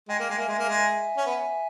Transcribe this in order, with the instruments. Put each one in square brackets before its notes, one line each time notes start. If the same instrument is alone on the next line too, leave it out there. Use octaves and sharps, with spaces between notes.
[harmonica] G#3 [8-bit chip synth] D#5 G5
[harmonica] A#3
G#3
[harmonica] A#3 [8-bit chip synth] E5 G#5
[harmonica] G#3
A#3
G#3
C#4
B3